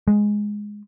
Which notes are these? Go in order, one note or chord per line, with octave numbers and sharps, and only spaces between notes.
G#3